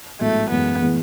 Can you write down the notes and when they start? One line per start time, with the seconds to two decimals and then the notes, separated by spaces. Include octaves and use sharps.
0.20 A1 G#2 F#3 A3 B3
0.51 F#2 E3 G#3 B3
0.82 A2 E3 G#3 B3